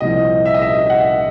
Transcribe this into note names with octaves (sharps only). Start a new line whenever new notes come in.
C2 A#2 F3 D#5
E5
D#5
E5
F#5